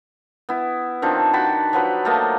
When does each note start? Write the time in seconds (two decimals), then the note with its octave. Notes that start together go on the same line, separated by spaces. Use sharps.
0.49 B3 E4
1.02 D#3 F3 C4 D4
1.34 F#4 G5 A5 B5
1.73 F3 F#3 B4
2.05 A3 A#3 D#5